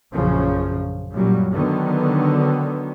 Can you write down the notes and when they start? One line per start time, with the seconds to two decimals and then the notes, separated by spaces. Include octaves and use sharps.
0.14 A#1 F#2 C#3 F3
1.14 F#2 A#2 F#3 G3
1.52 D3 D#3 F#3 B3